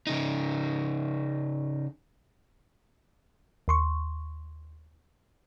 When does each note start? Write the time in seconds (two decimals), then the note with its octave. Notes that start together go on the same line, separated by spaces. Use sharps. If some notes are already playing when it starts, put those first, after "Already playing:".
0.07 C#3 D#4
3.68 D#2 C6 C#6